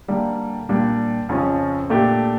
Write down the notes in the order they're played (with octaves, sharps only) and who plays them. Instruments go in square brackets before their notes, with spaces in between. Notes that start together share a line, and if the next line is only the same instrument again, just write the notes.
[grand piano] D3 G3 A#3
A#2 G3 D4
F2 C#3 F3 C#4
A#2 A3 D4 G4